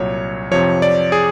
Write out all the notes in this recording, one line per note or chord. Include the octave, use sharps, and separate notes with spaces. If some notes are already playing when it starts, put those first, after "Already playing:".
Already playing: C2 A#2 F#3 C#5
F2 C3 F3 C#5
D5
G#4